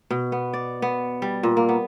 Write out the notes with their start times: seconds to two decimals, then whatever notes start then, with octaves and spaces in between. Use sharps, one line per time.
0.10 B2
0.32 B3
0.53 D5
0.82 B3
1.22 G3
1.43 A#2
1.57 A#3
1.69 B3